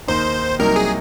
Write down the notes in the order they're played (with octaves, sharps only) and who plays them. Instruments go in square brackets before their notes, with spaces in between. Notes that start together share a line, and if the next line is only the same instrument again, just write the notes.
[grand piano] D#2 D#3 A#3 D#4 [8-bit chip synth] C5
[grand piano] C2 C3 F#3 A#3 D#4 [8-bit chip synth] A#4
[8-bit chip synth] G#4